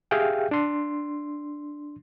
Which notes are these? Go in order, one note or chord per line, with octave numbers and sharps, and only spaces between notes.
G4 G#4 E5 F5 G5
D4 C6